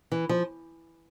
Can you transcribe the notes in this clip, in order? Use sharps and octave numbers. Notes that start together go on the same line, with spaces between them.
E3
F3